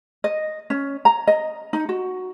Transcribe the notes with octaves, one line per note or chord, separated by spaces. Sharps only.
D#5
C#4
A#5
D#5
D#4
F#4